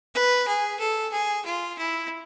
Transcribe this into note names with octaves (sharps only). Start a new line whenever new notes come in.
B4
G#4
A4
G#4
F4
E4